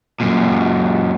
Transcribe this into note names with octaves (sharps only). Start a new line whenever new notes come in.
F#2 A#2